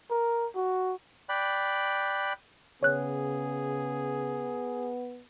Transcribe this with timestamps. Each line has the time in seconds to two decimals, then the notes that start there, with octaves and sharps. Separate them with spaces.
0.10 A#4
0.56 F#4
1.29 D5 G5 B5 F#6
2.83 C#3 B3 G#4 C#5 F#6